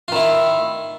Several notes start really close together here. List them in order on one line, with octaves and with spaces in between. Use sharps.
F4 D#3 E4